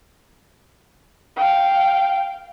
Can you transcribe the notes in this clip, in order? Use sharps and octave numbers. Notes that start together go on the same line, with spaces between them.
F5 G5